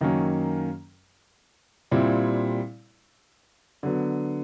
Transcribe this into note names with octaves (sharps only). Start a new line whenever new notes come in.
F#2 D#3 F#3 A#3 C#4
A#2 G3 C4 E4
D3 F#3 B3